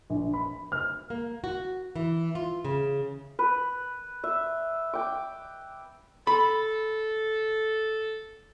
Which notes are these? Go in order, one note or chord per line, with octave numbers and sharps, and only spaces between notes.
A#1
B5
F6
A#3
F#4
E3
F4
C#3
B4
E5
G5 D6
A4 B5